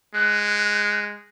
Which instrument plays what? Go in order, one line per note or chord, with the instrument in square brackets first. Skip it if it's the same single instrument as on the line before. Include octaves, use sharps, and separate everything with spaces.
[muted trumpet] G#3 [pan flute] F#6